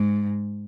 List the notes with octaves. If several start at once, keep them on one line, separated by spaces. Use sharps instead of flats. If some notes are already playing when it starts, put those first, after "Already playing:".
Already playing: G#2